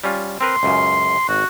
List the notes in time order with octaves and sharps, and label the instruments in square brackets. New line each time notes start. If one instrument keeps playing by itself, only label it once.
[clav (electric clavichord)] G3 C#4 F4
[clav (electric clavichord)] C4 A#4 B4 [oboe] C6
[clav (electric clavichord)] C#2 F#2 C#3
[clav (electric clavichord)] G#1 [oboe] F#4